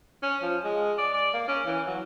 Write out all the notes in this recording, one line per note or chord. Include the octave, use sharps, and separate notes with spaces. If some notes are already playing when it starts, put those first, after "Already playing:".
C#4
F3
G#3
D5
D5
A#3
C#4
E3
F#3